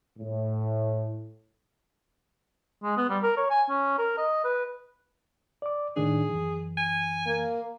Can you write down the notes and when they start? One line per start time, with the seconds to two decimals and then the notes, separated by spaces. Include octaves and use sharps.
0.19 A2
2.83 G#3
2.97 B3
3.09 G3
3.23 A#4
3.37 C#5
3.50 G#5
3.69 C#4
3.99 A#4
4.17 D#5
4.44 B4
5.62 D5 D6
5.96 A2 D#3 D4 G#4
6.30 F#2 E3
6.78 G#5
7.26 A#3